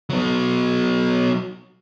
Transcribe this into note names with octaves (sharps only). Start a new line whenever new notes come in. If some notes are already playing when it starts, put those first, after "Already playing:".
F#3 B3